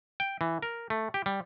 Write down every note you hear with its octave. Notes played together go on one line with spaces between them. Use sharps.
G5
E3
A#4
A3
G4
G3